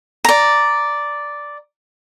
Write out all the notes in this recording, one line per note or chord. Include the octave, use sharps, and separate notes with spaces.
D5 A#5